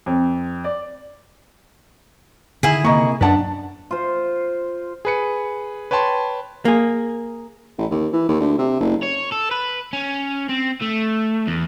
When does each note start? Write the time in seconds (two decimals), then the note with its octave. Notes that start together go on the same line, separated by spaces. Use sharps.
0.06 F2
0.64 D5
2.63 D3 D#3 E4 G#4
2.85 C3 A#3 D#5 A#5 C#6
3.21 F#2 D4 B4 D5 F#5 A5
3.91 F4 C5
5.05 G#4 B4 C#7
5.91 B4 C#5 G5 A5 C6
6.65 A#3 G#4
7.78 A1
7.91 D#2
8.13 E3
8.29 D#2
8.40 D2
8.58 C3
8.80 F#1
9.03 C#5
9.32 A4
9.51 B4
9.93 C#4
10.49 C4
10.82 A3
11.47 E2